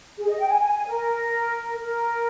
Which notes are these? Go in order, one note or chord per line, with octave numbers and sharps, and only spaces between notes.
G#4
D#5
G5
G#5
G#5
G#5
A#4
A#4